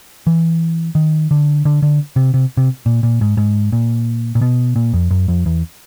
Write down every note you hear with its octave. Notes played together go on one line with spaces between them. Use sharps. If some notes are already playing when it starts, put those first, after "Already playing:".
E3
D#3
D3
D3
D3
C3
C3
C3
A#2
A#2
G#2
G#2
A#2
A#2
B2
A#2
F2
F#2
F2
E2